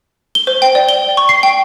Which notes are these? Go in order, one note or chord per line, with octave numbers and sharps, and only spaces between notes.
G7
C5
G5
D5
G7
C#6
C7
G5